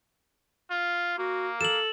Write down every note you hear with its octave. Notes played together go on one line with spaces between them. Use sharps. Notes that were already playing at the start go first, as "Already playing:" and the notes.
F4
A#3 F#4
A4 E7 F#7